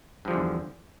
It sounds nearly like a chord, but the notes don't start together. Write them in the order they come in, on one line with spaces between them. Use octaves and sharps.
G2 F3 D3 E2